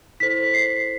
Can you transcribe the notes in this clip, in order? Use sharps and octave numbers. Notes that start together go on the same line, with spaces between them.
E4 A4 C5 B6
C7